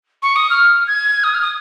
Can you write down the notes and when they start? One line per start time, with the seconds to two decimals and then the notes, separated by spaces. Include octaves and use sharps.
0.23 C#6
0.36 D#6
0.50 F6
0.87 G#6
1.24 D#6
1.34 F6
1.42 D#6